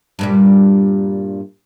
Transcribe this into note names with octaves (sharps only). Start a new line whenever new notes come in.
G2 A#2 G3